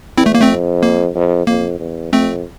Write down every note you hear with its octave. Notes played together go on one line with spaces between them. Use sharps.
E2 C4 E4
A3
A#3
A3 C4
F2
A#3
F2
F2 A#3
E2
F2 A3 C4